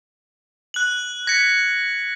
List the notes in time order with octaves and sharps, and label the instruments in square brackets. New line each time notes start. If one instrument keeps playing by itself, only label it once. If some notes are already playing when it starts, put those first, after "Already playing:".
[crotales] F#6 F#7
[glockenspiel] G#6 C#7 [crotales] A#6 B6